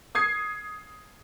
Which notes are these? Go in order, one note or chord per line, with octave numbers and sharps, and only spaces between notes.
D#6 G#6 C7